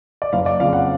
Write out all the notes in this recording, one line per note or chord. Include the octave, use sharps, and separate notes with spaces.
D5
F#1 F5
D5
F2 C#3 F5
F#5